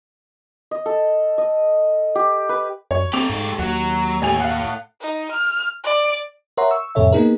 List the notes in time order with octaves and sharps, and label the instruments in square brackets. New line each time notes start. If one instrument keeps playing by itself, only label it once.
[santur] D#5
A4
D#5
G4
B4
[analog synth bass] F#2 [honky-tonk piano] C#5
[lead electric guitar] A3 G4 [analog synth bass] C4 [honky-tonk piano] D6 F7
[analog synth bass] G#2
[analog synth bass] D#2 [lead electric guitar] F#3 [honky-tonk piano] F#5
[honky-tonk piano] A1 G#5 F7 [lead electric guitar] A2
[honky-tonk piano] F5 F#5
[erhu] D#4
F6
D5
[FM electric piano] A#4 C#5 E5 F#5 A#5 C6
C#6 E6
F2 A2 C3 A4 C#5 E5
A#3 B3 D#4 G#4 A#4